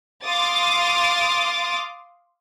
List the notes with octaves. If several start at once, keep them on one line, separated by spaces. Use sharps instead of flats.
F5 C6 D6 D#6 A6